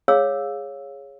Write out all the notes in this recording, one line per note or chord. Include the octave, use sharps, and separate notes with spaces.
G#4 C#5 F5 E6